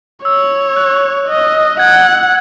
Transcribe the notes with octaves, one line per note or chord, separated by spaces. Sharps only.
C#5 E6
F#6
D#5
F#5 G#6